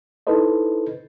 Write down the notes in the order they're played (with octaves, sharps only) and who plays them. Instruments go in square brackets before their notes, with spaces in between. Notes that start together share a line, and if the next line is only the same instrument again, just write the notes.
[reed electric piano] D#4 E4 A4 B4 C5 D#5